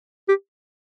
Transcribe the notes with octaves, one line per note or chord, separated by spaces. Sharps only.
G4